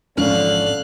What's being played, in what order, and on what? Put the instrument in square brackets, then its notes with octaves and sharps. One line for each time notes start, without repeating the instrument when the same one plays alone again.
[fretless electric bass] A1 F2 G#2 [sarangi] D3 [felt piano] C#4 [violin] F5 F#6